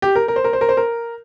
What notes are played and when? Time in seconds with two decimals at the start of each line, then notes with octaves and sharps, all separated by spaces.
0.02 G4
0.15 A#4
0.28 A#4
0.36 C5
0.44 A#4
0.53 C5
0.61 A#4
0.69 C5
0.77 A#4